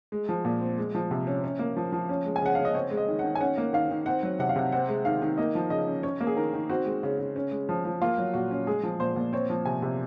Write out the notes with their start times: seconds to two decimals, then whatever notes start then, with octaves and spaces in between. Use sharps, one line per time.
0.12 G#3
0.29 F3
0.45 A#2
0.61 C4
0.78 G#3
0.95 F3
1.11 C3
1.27 C#4
1.44 C#4
1.59 A#3
1.76 F3
1.92 F3
2.09 C#4
2.26 G#3
2.36 G#5
2.42 C#3 F#5
2.55 C#3 F5
2.65 D#5
2.74 C4 C#5
2.91 G#3
2.97 D#5
3.08 D#3
3.19 F#5
3.24 D#3
3.35 G#5
3.41 C#4 F#5
3.58 A#3
3.73 D#3 F5
3.91 D#3
4.06 C4 F#5
4.23 F#3
4.39 C3 F#5
4.49 F5
4.56 C3 F#5
4.72 C4 F#5
4.89 G#3
5.05 D#3 F5
5.22 D#3
5.37 A#3 D#5
5.55 F3
5.70 C#3 D#5
5.87 C#4
6.03 C#4 C#5
6.21 A#3
6.27 G#4
6.36 D#3 A#4
6.53 D#3
6.69 C4 F#4
6.86 G#3
7.03 C#3
7.19 C#3
7.36 C#4
7.51 G#3
7.69 F3
7.85 F3
8.01 A#3 F4
8.18 F#3
8.34 A#2 F#4
8.51 C#4
8.67 G#3 G#4
8.83 F3
9.00 A#2 C5
9.16 A#2
9.33 C4 C#5
9.50 F3
9.66 C3 G#5
9.82 C3